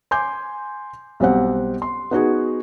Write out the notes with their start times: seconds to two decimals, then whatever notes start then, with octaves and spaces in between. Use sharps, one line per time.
0.11 G#5 C6 D6 G6
1.20 B1 G3 C4 F#5
1.82 C6
2.11 B3 D#4 F#4 G#4